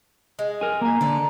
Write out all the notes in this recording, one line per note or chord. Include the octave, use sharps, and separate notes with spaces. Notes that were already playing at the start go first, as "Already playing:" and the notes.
G#3
A#4 G#5
A#3 G#5 A#5
D3 A4 D5